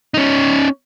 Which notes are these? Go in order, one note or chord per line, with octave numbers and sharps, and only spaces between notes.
C#4 D#4